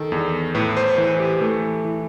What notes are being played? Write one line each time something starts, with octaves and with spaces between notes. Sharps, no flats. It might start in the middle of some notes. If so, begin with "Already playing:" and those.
Already playing: D#3 A4
E2
A2 B4
C5
E3 B4
G4
E3 A3
E3